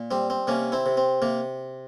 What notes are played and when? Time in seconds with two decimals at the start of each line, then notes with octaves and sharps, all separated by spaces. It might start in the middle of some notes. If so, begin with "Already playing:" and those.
Already playing: A#2
0.11 G3 C4
0.30 C4
0.47 C3 A#3 C#4
0.72 C4 E4
0.86 C3
0.97 C4
1.22 C3 A#3